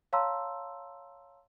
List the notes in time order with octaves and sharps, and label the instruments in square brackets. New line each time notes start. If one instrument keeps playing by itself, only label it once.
[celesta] C#5 F5 A5 A#5 C6 E6